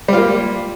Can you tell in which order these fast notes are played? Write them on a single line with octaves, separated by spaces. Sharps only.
G3 F4 A#3